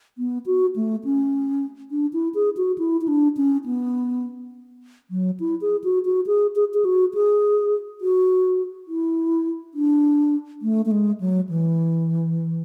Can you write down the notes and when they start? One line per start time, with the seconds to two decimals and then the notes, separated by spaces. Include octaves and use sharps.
0.18 B3
0.46 F#4
0.76 A3
1.05 C#4
1.91 D4
2.13 E4
2.35 G#4
2.57 F#4
2.78 E4
3.01 E4
3.08 D4
3.37 C#4
3.66 B3
5.11 F#3
5.40 E4
5.61 G#4
5.84 F#4
6.05 F#4
6.27 G#4
6.55 G#4
6.74 G#4
6.85 F#4
7.14 G#4
8.01 F#4
8.88 E4
9.74 D4
10.62 A3
10.85 A3
10.91 G#3
11.20 F#3
11.49 E3